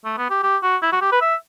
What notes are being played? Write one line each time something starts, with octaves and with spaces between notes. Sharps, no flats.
A3
B3
G4
G4
F#4
E4
F#4
G4
B4
E5